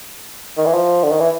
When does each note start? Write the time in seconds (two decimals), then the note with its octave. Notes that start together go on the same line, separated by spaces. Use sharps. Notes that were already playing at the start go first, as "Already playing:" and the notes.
0.58 D#3
0.66 E3
0.74 F3
1.03 D3
1.11 D#3
1.20 E3